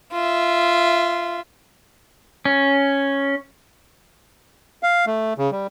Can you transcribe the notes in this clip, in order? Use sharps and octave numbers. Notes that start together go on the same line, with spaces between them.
F4 E5
C#4
F5
A3
C#3
G3